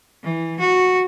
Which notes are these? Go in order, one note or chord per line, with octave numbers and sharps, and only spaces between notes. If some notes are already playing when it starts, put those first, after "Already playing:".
E3
F#4